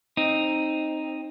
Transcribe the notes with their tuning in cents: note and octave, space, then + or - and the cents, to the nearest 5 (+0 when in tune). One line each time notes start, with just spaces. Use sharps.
C4 +15 D#4 +0